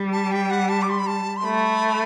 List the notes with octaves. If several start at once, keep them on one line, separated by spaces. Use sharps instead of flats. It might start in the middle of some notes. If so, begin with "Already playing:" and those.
Already playing: G3
A5
G5
F#5
A5
D6
C6
B5
A5
C6
A3 B5